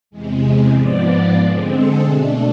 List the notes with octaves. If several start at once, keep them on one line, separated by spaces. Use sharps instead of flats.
E2 C3 G#3
G#2 F3 B3 D5
D3 G#3 C4 C5
A4
B2 A3 D4 G#4